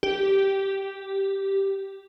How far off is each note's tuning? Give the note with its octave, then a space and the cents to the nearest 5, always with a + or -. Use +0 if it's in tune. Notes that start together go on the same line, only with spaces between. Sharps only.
G4 -5